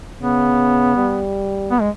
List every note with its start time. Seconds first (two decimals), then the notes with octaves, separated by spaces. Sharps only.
0.21 C#3 B3
0.96 G3
1.71 B3
1.81 G#3